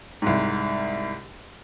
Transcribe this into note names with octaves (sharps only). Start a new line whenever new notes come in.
C2 G#2